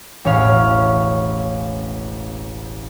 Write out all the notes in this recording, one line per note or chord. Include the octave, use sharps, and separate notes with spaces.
E1 A1 C#4 C#5 F5 F6